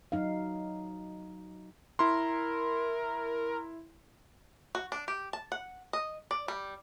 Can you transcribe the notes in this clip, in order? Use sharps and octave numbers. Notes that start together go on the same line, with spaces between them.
F#3 D#4 F5
E4 A#4 C6
F#4
D4
G4
A5
F#5
D#5
D5
G3